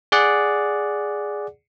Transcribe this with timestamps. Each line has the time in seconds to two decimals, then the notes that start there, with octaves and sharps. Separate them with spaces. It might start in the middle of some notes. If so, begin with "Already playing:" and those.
0.12 G#4 D5 F#5